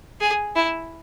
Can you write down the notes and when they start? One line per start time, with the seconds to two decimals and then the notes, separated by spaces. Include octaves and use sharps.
0.21 G#4
0.56 E4